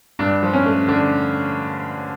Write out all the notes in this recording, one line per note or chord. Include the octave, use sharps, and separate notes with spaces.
G2 D4
F3
C#4
A3
D3 D4